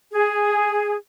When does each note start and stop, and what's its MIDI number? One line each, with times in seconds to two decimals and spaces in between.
0.13 0.95 68